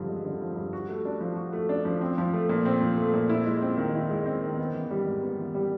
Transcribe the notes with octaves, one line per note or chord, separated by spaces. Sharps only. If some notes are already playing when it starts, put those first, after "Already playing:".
Already playing: G2 D3 F3
G#3
D3
F3
G2
F#4
A3
D4
F3
F#4
A3
D4
F3
C4
F3
A3
A#2
C4
F3
A3
A#2
E4
G#3
C4
D#3
E4
G#3
C4
D#3
B3
E3
G3
G#2
B3
E3
G3